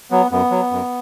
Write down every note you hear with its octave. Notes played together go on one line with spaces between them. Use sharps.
F#3 B3
F#2 B3
F#3
F#2